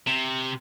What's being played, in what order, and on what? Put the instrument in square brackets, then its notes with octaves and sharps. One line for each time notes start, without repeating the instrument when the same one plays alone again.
[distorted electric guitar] C3